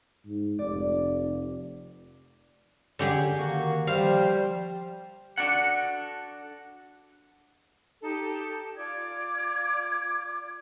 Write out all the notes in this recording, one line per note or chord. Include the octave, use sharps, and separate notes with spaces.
G#2
F1 D5
D3 G4 G#4
D#3 A#3 F#4 C#6
F3 G3 C5 F5
D4 F#4 A4 F#5
D#4 G4 A4
F4 D5 D6 G#6